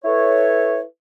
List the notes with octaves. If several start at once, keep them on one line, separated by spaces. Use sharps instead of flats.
E4 A4 B4 C#5